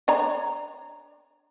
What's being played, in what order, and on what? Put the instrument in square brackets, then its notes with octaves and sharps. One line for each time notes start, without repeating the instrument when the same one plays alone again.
[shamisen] D4 C#5 A#5